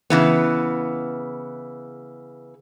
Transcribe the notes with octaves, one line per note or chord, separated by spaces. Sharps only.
C#3 E3 B3